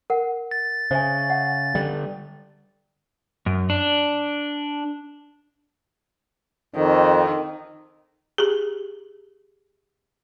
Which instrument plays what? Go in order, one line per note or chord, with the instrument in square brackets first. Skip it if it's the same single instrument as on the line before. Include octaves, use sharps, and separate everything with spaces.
[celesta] A#4 F#5
[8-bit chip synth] A6
[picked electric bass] C#3 [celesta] C5 E5 G#5
[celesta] E5 F#5
[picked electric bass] D3 G3
[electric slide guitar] F#2
D4
[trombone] F2 [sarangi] D#3
[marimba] G4 G#4